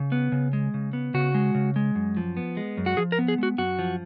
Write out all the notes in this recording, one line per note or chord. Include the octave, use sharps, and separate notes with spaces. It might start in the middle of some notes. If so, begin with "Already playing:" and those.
Already playing: C#3
B3
C#3
G#3
C#3
B3
C#3 F#4
G#3
C#3
G#3
F#2
F3
B3
G#3
F#2
F#4
F3 G#4
A#4
B3
G#4
G#3 F#4
F#2 F#4
F3